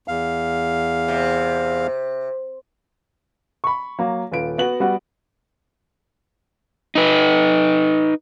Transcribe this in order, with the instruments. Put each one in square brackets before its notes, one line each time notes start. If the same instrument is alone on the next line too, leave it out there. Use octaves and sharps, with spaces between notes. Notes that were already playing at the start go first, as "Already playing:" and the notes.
[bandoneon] E2 F5
[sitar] C3
[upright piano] B5 C#6
F#3 A#3
D#1 F4 B4 D7
B3 F#4 F#7
G3 B3 F#4
[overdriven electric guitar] D#4 B4